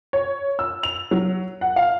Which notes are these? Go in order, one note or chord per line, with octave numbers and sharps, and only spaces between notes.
C#5
E6
F7
F#3
F#5
F5